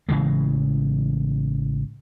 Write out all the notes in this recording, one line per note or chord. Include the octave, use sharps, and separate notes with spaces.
A1 C#3 E3 G#3